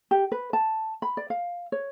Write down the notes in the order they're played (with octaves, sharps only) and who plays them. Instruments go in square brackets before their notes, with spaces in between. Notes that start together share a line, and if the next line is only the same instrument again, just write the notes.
[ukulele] G4
B4
A5
B5
D5
F5
C#5